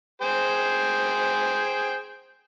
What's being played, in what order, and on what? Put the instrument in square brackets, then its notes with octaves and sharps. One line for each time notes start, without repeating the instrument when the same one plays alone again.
[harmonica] G#4 C5 G5